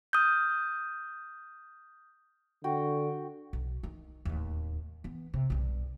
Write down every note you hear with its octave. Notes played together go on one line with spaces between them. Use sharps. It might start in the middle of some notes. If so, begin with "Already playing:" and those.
D#6 F6 G6
D3 F#4 G5
B1
D#3
D1 D#2
E3 B3
C3
B1 G2